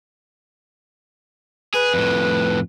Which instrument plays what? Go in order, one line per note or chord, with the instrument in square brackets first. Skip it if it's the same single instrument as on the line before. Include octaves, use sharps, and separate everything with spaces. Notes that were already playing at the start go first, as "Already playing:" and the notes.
[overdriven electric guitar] G#4 [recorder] B4
[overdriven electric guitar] F2 A2